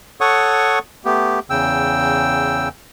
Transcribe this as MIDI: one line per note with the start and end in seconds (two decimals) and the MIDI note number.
0.21 0.79 69
0.21 0.79 73
0.21 0.79 78
0.21 0.79 85
0.21 0.79 87
1.05 1.39 57
1.05 1.39 59
1.05 1.39 67
1.50 2.68 40
1.50 2.68 49
1.50 2.68 79
1.50 2.68 88